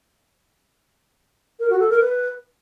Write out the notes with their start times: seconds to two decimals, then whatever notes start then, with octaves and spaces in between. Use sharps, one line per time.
1.60 A#4
1.70 F#4
1.80 A4
1.90 A#4
2.00 B4